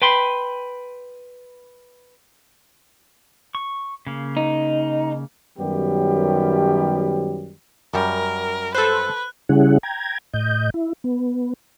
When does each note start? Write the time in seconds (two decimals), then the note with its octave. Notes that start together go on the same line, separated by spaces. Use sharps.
0.02 B4 G5 B5 C6
3.55 C#6
4.07 C#3 A#3
4.37 D#4
5.58 F#2 D#3 F#3 G3 B3 G4
7.94 F#2 G3 A#4
8.75 A4 B4 C5 F#6
9.49 C#3 G3 C#4 E4 G#4 F#5
9.83 G5 A#5 G#6
10.34 A2 D#5 G6
10.74 E4
11.04 B3